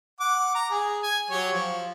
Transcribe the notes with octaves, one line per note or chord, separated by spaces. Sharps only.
F#5 D6
A#5
G#4
G#5
F#3 G4 C#5
F3